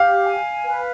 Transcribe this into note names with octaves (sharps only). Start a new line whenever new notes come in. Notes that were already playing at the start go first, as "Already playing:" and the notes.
Already playing: G4 F5
G#5
B4